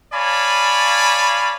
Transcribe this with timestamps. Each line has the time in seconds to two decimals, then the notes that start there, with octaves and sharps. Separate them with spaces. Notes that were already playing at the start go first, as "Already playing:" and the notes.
0.14 C#5 D5 F5 G#5 A5 B5